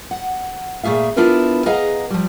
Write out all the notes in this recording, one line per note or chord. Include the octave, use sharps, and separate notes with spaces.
F#5
A#2 A3 G#4 E5 F5
B3 D4 E4 F4 A#4 B4
G#4 B4 D#5 F5 F#5 A#5
F3 G3